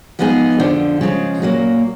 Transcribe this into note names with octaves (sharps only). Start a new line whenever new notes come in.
F3 G#3 B3 D#4 G#4
F2 D3 F3
C#3 F3 G#3
A#2 F#3 A#3